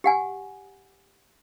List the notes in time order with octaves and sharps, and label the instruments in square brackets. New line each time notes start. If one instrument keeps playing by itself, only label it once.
[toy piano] G4 F#5 G#5